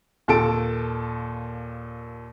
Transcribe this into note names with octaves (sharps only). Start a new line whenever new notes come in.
D#2 A#2 A4 A5 D7